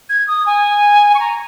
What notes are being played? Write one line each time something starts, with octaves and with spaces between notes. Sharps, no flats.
G#6
D#6
G#5
C#6
A#5